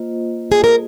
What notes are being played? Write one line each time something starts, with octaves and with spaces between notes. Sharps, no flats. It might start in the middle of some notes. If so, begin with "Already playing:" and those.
Already playing: A#3 F4 C5 D#5
G#4
A#4